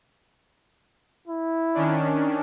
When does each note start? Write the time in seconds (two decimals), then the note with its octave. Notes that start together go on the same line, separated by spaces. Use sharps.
1.28 E4
1.74 D#3 C#4 D4